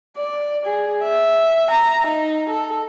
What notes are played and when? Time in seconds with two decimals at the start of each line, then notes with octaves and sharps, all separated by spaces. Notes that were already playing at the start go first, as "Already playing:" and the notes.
0.17 D5
0.66 G#4
1.03 E5
1.71 A#5
2.07 D#4
2.50 A4